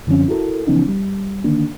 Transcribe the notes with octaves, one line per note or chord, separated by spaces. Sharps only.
F#2 D3 F3 C4 C#4
E4 F#4 A4 A#4
C#3 E3 F3 B3 C#4 D#4
G3
D3 D#3 A#3 D4